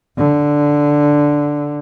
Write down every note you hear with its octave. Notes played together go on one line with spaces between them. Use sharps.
D3